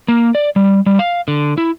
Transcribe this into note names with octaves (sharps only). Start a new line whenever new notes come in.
A#3
D5
G3
G3
F5
D3
E4